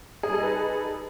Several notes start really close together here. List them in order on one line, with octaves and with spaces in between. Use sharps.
G#4 G3 A4 D#4 B4